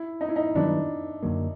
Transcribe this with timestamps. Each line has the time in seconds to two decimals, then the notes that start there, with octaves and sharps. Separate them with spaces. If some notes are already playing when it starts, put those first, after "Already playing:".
Already playing: E4
0.21 D#4
0.29 E4
0.36 D#4
0.55 G2 D#3 F#3 B3 D4
1.23 F#2 D3 F#3 A#3